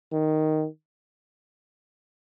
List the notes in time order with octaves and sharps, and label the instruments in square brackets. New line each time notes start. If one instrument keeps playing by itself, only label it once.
[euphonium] D#3